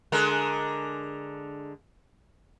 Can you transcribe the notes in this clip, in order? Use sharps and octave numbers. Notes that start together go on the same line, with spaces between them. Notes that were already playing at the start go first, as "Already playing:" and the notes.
D3 G#3 A#4